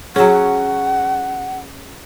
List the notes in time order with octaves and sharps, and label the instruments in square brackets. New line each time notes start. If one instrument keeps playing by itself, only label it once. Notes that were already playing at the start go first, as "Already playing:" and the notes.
[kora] F#3 C#4 [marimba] G#4 [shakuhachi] F#5